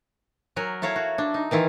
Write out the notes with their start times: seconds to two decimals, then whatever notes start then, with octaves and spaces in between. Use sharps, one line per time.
0.56 F#3 A#4 F#5 G#5
0.82 E4 A4 C#5 F5 A#5
0.96 F#4
1.18 D4
1.34 D#4
1.51 D#3 E3 E4 F4